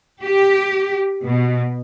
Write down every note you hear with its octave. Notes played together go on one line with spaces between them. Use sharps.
G4
B2